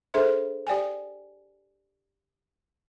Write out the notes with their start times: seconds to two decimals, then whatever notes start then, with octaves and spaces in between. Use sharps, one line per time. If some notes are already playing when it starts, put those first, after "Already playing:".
0.14 D4 G#4 A4 C5 E5 C6
0.67 G4 D5 G5 G#5